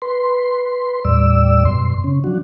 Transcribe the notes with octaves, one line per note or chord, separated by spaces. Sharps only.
B4 C6
D#2 A2 G3 D5 E6
F#2 B2 C6
C#3 C#4
F3 F#3 D4 F#4